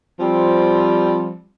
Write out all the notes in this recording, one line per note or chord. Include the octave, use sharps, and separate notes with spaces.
F3 G3 C4